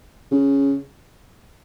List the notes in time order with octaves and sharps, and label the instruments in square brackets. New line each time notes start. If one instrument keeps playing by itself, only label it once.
[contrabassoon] C#3